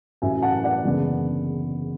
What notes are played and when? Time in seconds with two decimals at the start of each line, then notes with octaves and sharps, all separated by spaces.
0.22 A1 A2 F#3 E5 G#5
0.42 F#5 A5
0.64 D5 F#5
0.84 F#1 E2 D3 G#3 B3